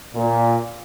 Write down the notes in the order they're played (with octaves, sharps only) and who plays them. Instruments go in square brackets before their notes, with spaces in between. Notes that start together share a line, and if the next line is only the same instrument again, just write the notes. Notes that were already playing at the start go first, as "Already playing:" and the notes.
[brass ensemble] A#2